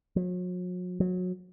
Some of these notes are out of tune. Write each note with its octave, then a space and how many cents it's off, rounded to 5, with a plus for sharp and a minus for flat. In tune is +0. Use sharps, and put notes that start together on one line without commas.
F#3 -40
F#3 -25